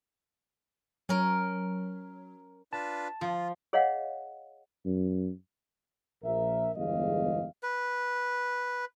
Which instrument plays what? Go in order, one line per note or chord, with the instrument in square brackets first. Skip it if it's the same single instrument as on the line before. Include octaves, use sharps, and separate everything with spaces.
[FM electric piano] F#3 [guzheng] C#4 A#4
[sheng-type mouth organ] D4 F4 B4 [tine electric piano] A5
[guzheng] F3 [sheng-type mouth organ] F4
[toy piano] G#4 C#5 D#5 F5 F#5
[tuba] F#2
[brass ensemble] A#1 A#4 E5
G1 E2 G#2 G#3 D#5 F5
[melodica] B4